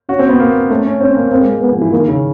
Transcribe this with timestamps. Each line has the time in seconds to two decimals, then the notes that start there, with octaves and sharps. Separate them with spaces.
0.09 C#4 F#4
0.19 C4
0.29 B3
0.40 A#3
0.70 A3 C#4
0.85 C#4
1.01 C4 C#4
1.16 A#3
1.31 A#3 C4
1.41 G#3
1.52 G#3
1.62 B3
1.72 F3
1.81 E3
1.92 D#3 A#3
2.08 C#3